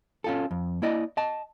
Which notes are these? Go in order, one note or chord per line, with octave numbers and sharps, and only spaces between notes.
C#4 F4 A4
F2
A#3 E4 D5 D#5
D#5 A5